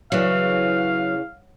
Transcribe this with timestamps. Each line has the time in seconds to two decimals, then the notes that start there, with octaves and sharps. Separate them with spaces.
0.12 C#3 E3 F#3 F5